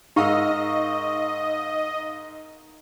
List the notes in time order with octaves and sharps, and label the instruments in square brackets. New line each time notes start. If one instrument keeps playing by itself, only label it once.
[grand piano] G#2 [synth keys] D#4 F5 E6 [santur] A#4 F#5 C#6 [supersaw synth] D#5